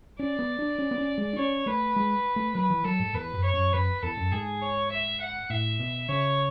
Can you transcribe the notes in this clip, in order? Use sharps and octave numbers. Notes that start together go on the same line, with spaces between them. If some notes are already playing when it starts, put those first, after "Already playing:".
C#4 D5
B3
D4
C#4
B3
C#4
G#3
D4
C#4 C#5
A3 B4
G#3
A3
F#3 B4
E3
F#3 A4
G#2
E2 B4
F#2
C#5
F#2
F#2 B4
E2 A4
F#2
G#2 G#4
C#5
E5
F#5
A2 E5
B2
C#3 C#5